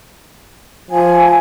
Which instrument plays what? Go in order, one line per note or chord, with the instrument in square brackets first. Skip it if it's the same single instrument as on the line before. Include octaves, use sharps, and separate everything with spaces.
[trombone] F3 [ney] G#5